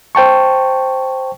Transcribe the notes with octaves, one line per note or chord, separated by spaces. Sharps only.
C5 G5 A5 C#6